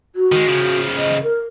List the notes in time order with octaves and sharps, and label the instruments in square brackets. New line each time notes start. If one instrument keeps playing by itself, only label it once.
[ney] F#4
[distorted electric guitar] D#3 G#3
C#3 F3
[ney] D#5
A#4